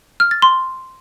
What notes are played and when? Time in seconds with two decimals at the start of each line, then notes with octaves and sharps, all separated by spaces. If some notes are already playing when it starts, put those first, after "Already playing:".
0.20 F6
0.31 A6
0.42 C6